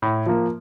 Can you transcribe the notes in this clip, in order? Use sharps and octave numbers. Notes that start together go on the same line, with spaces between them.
A2
F3 A#3